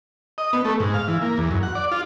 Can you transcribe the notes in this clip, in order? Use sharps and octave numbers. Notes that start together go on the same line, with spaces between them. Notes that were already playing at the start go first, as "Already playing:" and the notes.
D#5
B3
A3
G#2
F5
E3
A#3
E2
F#2
F#5
D5
F4